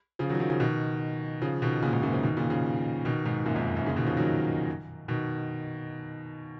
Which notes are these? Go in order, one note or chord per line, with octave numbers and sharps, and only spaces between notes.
C#3 F3
D#3 F#3
F3
D#3 F#3
C#3 F3
B2 D#3
C#3 F3
B2 D#3
A#2 C#3
G#2 B2
F#2 A#2
C#3 F3
B2 D#3
A#2 C#3
C#3 F3
B2 D#3
G#2 B2
F#2 A#2
F2 G#2
F#2
A#2 C#3
B2 D#3
C#3 F3
D#3 F#3
B2 D#3